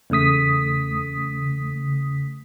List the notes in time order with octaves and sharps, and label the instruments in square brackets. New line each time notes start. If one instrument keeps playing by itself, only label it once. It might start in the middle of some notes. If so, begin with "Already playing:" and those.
[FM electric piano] E2 C#3 A3 D#6 B6